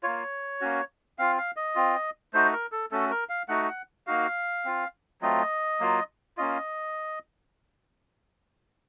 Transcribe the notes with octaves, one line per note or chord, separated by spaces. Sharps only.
A#3 F4 C#5
A#3 C#4 F#4
C4 F4 F5
F5
D#5
C4 F4
A3 D#4 F#4 C5
A#4
A4
A3 C#4 F#4 A4
A#4
F5
A3 D#4 F#4 F#5
F#5
A#3 D#4 F#4 F5
C4 F4
F#3 A3 C4 F4 D#5
F#3 A#3 F4
A#3 C#4 F4 D#5